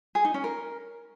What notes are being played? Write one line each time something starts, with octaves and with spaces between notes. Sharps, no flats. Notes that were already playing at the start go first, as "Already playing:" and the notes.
G#4
D#4
C#4
A#4